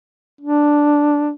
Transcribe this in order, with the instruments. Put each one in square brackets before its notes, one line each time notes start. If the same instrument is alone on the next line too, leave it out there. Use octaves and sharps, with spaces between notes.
[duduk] D4